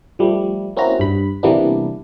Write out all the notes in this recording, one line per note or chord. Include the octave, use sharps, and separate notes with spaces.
F3 G3 A3
A#3 C4 C#4 E4 F#4 A#5
G2 B5
C3 E3 G3 A#3 B3 D4